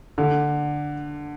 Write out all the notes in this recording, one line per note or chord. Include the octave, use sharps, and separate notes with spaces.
D3